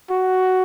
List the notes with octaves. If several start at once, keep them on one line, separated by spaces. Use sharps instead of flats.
F#4